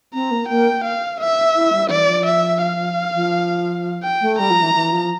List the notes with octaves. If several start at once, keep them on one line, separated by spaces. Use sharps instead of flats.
C4 A#5
A#3
A#3 G5
F5
E5
E4
G3
E3 D5
F3
E5
F5
F3
G5
A3
G3 A#5
F3
E3
E3
F3